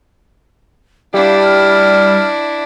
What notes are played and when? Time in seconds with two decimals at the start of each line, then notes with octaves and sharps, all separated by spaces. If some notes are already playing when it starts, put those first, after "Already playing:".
1.14 G3 D4 E4 F5
1.43 F6